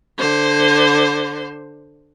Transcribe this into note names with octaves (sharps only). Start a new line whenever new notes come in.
D3 C5